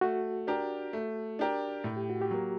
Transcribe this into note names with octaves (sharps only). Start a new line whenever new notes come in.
A3 F#4
D4 G4 A#4
A3
D4 G4 A#4
A2
G4
F#4
G4
F#3 A#3